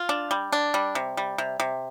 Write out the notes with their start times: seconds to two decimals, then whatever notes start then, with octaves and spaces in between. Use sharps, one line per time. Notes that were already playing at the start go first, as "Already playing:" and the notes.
Already playing: F4
0.09 D4
0.31 G3
0.52 D4
0.74 G3
0.95 C3
1.17 G3
1.38 C3
1.60 C3